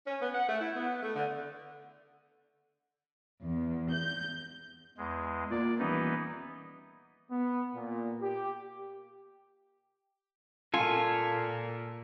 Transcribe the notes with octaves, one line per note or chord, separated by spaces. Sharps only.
C#4
B3
F#5
A3
E4
B3
A3
D3
E2
G6
E2 G#3
A#2 D5
D#1 E3 B3 D#4
B3
A#2
G4
A#2 A#3 F4 A4 G#5